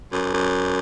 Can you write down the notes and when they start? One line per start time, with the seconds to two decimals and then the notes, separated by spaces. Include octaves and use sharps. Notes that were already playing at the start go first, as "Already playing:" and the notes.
0.12 F#2
0.34 F#2